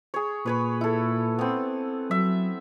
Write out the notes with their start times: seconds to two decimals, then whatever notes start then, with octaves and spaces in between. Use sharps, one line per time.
0.14 G#4 C#5
0.46 A#2 B4 C#5 B5
0.81 E4 A4
1.39 B3 C4
2.11 F#3 E5